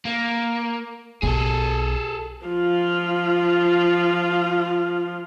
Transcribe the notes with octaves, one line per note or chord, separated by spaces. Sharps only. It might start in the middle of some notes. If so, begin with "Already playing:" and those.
A#3
B1 G#4 A4
F3 F4